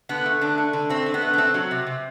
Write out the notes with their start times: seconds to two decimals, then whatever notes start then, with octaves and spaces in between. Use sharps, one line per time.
0.09 D3 B3
0.26 A3
0.41 D3 D4
0.58 A3
0.73 D3
0.90 A3 C4
1.06 D3
1.14 B3
1.22 A3
1.33 D4
1.38 A3 C4
1.54 F#3
1.71 C3
1.87 C3